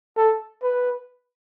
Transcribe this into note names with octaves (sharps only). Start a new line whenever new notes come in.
A4
B4